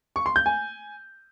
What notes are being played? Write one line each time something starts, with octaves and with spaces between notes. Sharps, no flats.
C#6
C6
G6
G#5